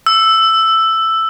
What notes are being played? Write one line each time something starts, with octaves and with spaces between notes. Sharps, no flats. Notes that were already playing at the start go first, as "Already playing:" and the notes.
E6